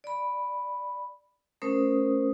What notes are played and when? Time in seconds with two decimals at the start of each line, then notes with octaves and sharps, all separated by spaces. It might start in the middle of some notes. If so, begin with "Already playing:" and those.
0.04 D5 B5
1.62 A3 C#4 A#4 C5 D#6